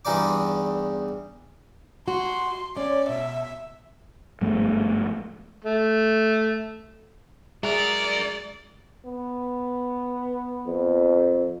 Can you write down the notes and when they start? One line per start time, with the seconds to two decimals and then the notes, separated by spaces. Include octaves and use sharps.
0.05 E2 G2 E3 D#4 D5 D6
2.08 F#4 C6
2.77 C#4 D5
3.09 B2 E5
4.41 G1 G#2 F3 A3
5.64 A3
7.63 F#3 G#3 G#4 A#4 D5 E5
9.05 B3
10.67 F2